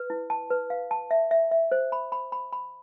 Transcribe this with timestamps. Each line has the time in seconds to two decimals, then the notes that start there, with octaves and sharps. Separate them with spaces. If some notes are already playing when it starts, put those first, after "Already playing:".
Already playing: B4
0.10 E4
0.30 A5
0.50 B4
0.70 F5
0.91 A5
1.11 E5
1.31 E5
1.51 E5
1.72 C5
1.92 B5
2.12 B5
2.32 B5
2.53 B5